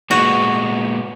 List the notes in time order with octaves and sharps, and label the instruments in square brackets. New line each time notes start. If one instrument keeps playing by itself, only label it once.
[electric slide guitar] A#2 G#3 B3 [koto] F#4